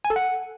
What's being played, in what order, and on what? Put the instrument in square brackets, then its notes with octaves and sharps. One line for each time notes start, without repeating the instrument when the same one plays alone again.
[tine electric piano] G#5
A4
F#5